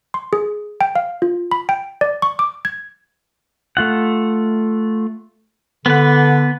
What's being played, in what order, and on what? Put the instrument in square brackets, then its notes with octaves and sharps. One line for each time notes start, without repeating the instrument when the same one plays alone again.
[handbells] C6
G#4
G5
F5
F4
B5
G5
D5
C#6
D6
G#6
[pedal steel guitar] A3 F4 F#5
[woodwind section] D3 [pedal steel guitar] B3 B4